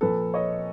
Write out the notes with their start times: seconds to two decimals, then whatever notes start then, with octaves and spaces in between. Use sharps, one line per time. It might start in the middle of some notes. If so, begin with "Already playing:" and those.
0.01 A#2 F3 A#3 A4 B4
0.34 C#5 D#5